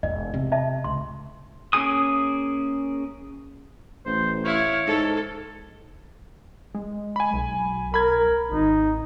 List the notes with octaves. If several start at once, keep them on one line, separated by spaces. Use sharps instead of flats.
E1 D#5
C3
D#5 E5 A5
C#2 C6
A#3 C#4 G#4 G#5 D#6
A1 C5
E4 C#5 F5
G#2 A4
G#3
G#5 B5
B1
A#4 B5 G#6
G#1 D#4